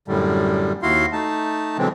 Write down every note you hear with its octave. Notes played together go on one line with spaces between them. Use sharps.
F#2 A2 D3 G3
D#2 E4 F#4 F5 C6
A3 D#4 A5
B2 D3 E3 F#3 G#3 C4